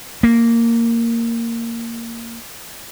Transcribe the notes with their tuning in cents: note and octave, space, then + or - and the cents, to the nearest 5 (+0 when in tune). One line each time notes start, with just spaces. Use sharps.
A#3 -10